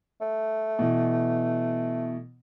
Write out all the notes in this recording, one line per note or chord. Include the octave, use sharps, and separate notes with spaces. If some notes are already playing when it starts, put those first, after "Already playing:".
A3
B2 E3